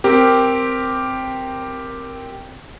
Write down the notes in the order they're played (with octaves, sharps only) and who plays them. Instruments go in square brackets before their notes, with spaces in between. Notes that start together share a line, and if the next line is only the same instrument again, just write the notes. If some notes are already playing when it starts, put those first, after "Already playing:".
[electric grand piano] C4 G4 A#4